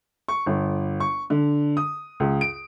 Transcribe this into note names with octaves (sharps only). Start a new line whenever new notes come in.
C#6
G1
C#6
D3
D#6
C#2
D7